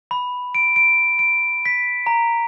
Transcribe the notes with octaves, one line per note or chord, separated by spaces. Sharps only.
B5
D7
D7
D7
B6
A#5